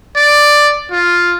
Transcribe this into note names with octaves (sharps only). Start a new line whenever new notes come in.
D5
F4